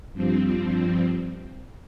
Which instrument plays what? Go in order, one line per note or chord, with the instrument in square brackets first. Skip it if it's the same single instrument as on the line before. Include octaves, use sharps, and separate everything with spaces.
[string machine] G2 F3 C4